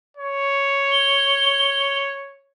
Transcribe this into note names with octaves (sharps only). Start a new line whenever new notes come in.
C#5
G7